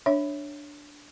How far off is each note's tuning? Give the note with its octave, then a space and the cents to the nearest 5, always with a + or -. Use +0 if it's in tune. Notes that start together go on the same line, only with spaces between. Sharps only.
D4 +0 C#5 +0 E5 +0